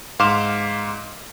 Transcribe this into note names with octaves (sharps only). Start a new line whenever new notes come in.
G#2 F5 C6 D6 F6 E7